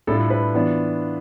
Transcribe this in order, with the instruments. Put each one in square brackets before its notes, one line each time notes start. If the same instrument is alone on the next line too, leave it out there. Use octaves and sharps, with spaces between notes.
[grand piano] A2 G3 D4 F4 A4
B4
E3 B3 D4 F4